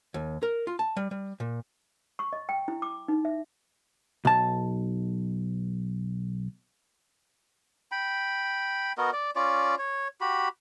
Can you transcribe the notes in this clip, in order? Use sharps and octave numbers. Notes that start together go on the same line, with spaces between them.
D#2
A#4
F4
A5
G3
G3
A#2
C#6
D#5
G5
E4
D6
D#4
E5
B1 A5
G5 B5
B3 F#4 A#4 D#5
D5
C#4 F4 D5
C#5
F#4 G4 B5